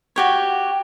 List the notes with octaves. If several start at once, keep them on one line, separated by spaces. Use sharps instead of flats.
F#4 G4 C#5